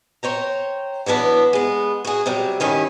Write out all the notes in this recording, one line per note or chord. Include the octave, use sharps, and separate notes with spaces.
C5 C#5 G5 A#5
E3 F#3 B3 D4 B4
G#3 B3
F#4 G#4
C3 F#3 G3
G2 D#3 C#4 E4